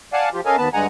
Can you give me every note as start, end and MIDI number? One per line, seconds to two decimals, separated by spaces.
0.13 0.29 74
0.13 0.29 77
0.13 0.29 78
0.13 0.29 80
0.13 0.29 81
0.34 0.41 53
0.34 0.41 65
0.34 0.41 67
0.45 0.56 61
0.45 0.56 69
0.45 0.56 70
0.45 0.56 75
0.45 0.56 77
0.45 0.56 80
0.57 0.69 39
0.57 0.69 59
0.57 0.69 71
0.57 0.69 81
0.73 0.87 43
0.73 0.87 50
0.73 0.87 56
0.73 0.87 78
0.73 0.87 80
0.73 0.87 82